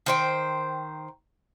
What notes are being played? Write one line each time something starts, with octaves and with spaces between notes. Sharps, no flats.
D#3 C5 G5